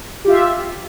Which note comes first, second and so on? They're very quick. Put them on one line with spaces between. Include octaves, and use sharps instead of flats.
G4 F4 E5